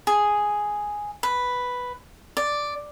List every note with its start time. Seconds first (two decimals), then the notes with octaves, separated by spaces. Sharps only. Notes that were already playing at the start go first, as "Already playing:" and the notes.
0.07 G#4
1.23 B4
2.37 D5